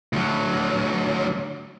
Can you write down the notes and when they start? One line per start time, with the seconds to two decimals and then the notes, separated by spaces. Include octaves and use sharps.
0.13 D2 F#3